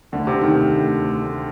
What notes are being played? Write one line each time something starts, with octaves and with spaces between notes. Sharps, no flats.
D2 D3
C3
D3 A3
D#3
D2
D3 A3
D2
D3 A3